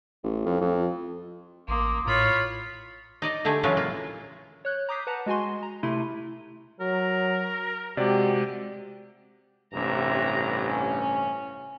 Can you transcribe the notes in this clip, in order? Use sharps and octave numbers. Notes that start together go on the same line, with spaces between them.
A1
F2
F2
A1 A#3 C6 D6 D#6
A2 F4 C#5 B5
D#4 D5 D#5
D3 A3 G4 G#4
C#3 E3 F#3 G#3 C#4 F4
A#2 A#3 F4
C#5 F#6 G6
A#5 D6 D#6 G6 B6 C7
B4 F#5 A5 A#5
G#3 F#4 G#5 C6
A#5
C3 A3 E4 C6 D#7
F#3 A#4
C3 G#3 F#4 G4 D5
A1 G2 C3 E5 A#5
C#4